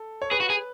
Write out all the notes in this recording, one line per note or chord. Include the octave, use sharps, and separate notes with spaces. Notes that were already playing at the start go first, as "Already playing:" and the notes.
Already playing: A4
C#5
G#4 B4
F#4
G#4